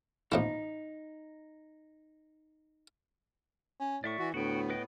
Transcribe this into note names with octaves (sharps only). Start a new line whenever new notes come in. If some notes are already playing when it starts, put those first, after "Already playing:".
A1 F3 D#4 E4
C#4
A2 D5 E5 C#6
E3 F#4
D2 A2 B3 F#4 G5
B4 D#5 G5